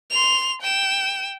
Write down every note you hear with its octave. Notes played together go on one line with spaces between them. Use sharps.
C6 F7
G5 E7